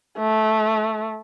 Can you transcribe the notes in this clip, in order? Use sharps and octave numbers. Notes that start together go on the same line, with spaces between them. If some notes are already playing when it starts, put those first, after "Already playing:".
A3